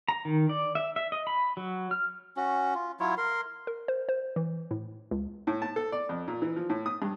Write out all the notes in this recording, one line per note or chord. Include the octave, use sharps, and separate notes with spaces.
A#5
D#3
D5
E5
E5
D#5
B5
F#3
F6
C#4 F#4
F4
F#3 E4 F4 C#5
A#4 C6
A#4
C5
C5
E3
A2
C#2
A2
A5
A4
D5
F2
A#2
E3
F3
A2
D#6
G2